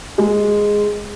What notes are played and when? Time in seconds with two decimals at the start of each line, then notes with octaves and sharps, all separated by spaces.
0.18 G#3